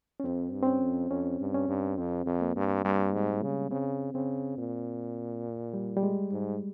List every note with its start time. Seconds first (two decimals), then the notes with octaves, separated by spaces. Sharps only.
0.20 C#4
0.24 F2 C4
0.53 G2
0.63 C4
0.67 C#4
0.82 F2
1.10 F2 C#4
1.40 G2
1.54 C#4
1.68 G2
1.98 F2 C4
2.26 F2
2.41 A#3
2.56 G2
2.85 G2 G3
3.13 G#2 G3
3.28 G#3
3.43 C#3
3.71 C#3 C4
4.14 C#3 C4
4.58 A#2
5.74 G3
5.97 G3
6.03 G#3
6.32 G#2